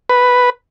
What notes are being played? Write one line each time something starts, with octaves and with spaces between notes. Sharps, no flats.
B4